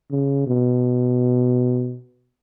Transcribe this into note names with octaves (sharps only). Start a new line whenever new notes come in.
C#3
B2